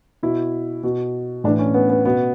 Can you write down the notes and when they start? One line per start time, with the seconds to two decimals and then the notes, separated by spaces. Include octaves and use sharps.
0.23 B2 E4
0.83 B2
1.44 A2 D4
1.48 E3
1.59 C#4
1.74 B3
1.90 B3
2.05 B2 B3